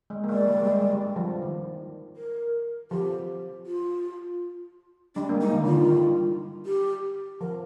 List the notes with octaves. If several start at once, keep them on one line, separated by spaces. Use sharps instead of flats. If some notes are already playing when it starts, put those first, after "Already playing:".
G#3
A#3
G#3 D5
G3
G3
G#3
G#3
G3
F3
D#3
A#4
F3 G4
F4
G3 D4
A#3
G#3
D#4
D#3
D3 F4
D#3
G3
G4
F3 A#4